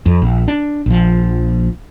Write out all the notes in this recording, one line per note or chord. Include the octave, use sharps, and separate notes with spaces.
F2
A#1
D4
A#1 F3